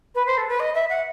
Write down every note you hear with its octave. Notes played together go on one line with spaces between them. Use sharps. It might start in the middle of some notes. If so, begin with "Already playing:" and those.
B4
C5
A4
B4
D#5
E5
F#5